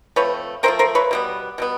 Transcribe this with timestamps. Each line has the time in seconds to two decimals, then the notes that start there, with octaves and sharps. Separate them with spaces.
0.16 F3 A3 C4 B4 C#5
0.63 F3 A3 C4 A#4 C5
0.79 A#4 C5
0.95 B4 C#5
1.11 B2 G3 B3
1.58 B2 G3 B3